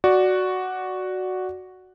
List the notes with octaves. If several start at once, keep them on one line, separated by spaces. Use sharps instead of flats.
F#4 D5